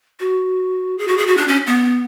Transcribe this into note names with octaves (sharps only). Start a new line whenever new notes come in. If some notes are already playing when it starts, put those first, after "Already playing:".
F#4
G#4
F#4
G#4
F#4
D4
C#4
B3